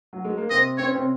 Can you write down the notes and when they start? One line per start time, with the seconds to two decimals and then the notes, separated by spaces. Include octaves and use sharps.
0.13 F#3
0.24 G#3
0.37 A#3
0.50 C3 C4 D#5
0.78 C4 C#5
0.86 C#4
0.94 C3 C4